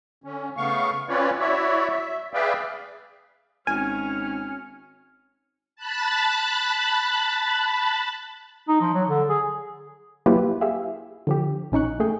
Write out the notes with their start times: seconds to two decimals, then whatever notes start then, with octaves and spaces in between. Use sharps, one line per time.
0.24 D3 C#4
0.57 C#3 A3 B3 F5 C#6
1.09 C4 C#4 F4 B4 C#5 D5
1.39 E4 F#4 C#5 D5 E5
1.90 E5
2.34 G#4 B4 D5 E5 F5 G5
3.67 G#1 C#4 G#5 F6
5.76 A5 B5 F#6 A6
8.68 D#4
8.81 F3
8.94 F#3
9.08 D3
9.29 G#4
10.26 F#3 A#3 E4 F4 G4 B4
10.61 G4 G#4 E5 F5
11.27 D3 F3 G4
11.72 A#1 C#4 D#4 C#6 F#6
12.00 A3 G#4 G5